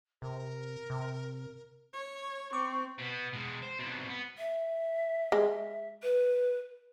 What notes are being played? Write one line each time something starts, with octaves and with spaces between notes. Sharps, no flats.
C3 A#4
C3
C#5
C4 C#6 D6
B2 B3
B2 G#3
C5
C2 B2
B3
E5
G#3
B4